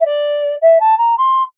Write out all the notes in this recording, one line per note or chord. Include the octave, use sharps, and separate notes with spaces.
E5
D5
E5
A5
A#5
C6